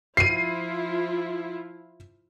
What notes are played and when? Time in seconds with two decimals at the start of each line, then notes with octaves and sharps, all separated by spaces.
0.17 F3 E4 F4 C7 D#7